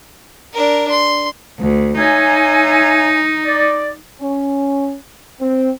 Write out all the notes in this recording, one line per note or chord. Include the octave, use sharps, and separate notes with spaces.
D4 A#4
C6
D2
D#4 C#5 E5 G#5
D5
C#4
C4